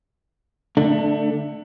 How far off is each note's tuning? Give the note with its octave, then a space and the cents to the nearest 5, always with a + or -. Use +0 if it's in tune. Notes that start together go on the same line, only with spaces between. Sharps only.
D3 +0 A3 +5 D4 +30